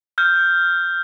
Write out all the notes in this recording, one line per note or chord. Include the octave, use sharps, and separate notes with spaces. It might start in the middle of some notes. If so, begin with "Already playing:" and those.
F6 G6